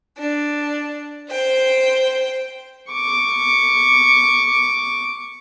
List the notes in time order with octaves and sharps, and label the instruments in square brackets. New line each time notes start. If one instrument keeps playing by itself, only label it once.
[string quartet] D4
C5 G5
[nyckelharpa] C#6 D6